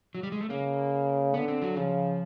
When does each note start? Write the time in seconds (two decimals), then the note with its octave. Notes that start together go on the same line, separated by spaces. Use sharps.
0.15 F#3
0.23 G3
0.32 G#3
0.41 A3
0.50 C#3 A#3
1.34 D3 B3
1.48 C4
1.62 F#3
1.76 C#3 F3